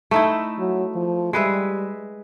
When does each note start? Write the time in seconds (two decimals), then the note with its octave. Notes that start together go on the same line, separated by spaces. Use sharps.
0.11 A3 D#4 E4
0.59 F#3
0.96 F3
1.33 G3 G#3 B4 E5